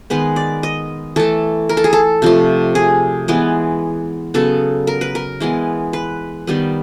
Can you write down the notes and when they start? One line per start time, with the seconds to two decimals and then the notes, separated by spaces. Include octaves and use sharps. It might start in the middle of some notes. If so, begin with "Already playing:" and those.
0.10 D#3 G#3 B3 B4
0.36 D5
0.63 D#5
1.16 E3 A3 A4
1.69 A#4
1.77 A4
1.84 G#4
1.93 A4
2.22 C3 F3 A3
2.75 G#4
3.28 E3 G#3 B3
4.34 C#3 F#3 B3 A4
4.87 A#4
5.01 B4
5.15 A#4
5.40 E3 G#3 B3
5.93 B4
6.47 D#3 G3 B3